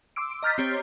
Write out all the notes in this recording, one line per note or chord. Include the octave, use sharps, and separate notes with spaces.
C6 D6 E6 D7
D#5 A#5 F6 G6 A6 B6
C4 G4 C#5